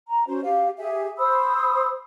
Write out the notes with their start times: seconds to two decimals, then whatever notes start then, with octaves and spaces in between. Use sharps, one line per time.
0.08 A#5
0.27 C#4 F#4 C5
0.43 G4 F5
0.78 G4 G#4 E5 G#5
1.18 C5 B5 D#6 E6